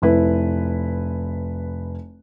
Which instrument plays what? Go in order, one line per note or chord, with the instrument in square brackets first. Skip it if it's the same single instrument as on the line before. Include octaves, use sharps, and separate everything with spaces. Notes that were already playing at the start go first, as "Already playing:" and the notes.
[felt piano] F1 E4 B4